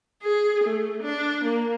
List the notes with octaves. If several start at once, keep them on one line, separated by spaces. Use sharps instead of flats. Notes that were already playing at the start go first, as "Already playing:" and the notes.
G#4
A3
D4
A#3